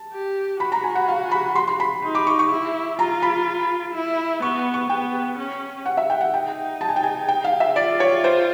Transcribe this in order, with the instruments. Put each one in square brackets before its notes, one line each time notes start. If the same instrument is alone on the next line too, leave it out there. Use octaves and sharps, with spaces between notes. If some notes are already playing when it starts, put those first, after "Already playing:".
Already playing: [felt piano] A5
[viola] G4
[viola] F#4 [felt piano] B5
[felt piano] A#5
G#5
F#5
F5
B5
C6
C6
B5
[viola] D#4
[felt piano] D6
C#6
C#6
[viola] E4
[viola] F4 [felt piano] A#5
[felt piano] B5
[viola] E4
[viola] B3 [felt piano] C#6
[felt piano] C#6
[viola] B3 [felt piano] G5
[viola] C#4
[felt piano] F#5
E5
G5
F#5
[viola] D#4 [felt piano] G5
[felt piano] A5
G#5
G5
G#5
G5
F5
E5
[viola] F4 [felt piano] D5
[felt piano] C#5
C5